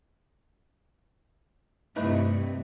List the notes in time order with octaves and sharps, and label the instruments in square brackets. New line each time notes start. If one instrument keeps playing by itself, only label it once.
[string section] G2 C3 [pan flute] A3 [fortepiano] E4 B4 D#5